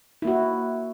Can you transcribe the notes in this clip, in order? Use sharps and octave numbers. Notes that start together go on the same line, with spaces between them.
A#3 E4 F#4